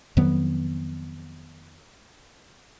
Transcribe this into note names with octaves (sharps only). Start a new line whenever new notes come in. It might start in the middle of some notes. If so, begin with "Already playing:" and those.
F2 D#3 F#3 B3